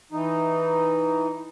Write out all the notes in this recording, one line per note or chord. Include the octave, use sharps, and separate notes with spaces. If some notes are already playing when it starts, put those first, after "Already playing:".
E3 D#4